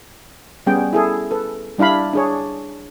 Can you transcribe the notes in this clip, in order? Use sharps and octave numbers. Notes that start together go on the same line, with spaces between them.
G3 B3 C#4 G#4 G5
E4 G#4 A4
A4 B4
G3 D4 E4 F5 B5
D4 G#4 C#5